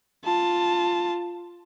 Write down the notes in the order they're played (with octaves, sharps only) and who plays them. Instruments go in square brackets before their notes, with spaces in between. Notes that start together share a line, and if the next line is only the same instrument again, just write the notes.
[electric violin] F4 A5